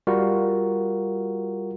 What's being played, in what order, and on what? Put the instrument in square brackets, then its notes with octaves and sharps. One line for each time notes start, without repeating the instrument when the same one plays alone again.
[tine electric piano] G3 F4 F#4 A#4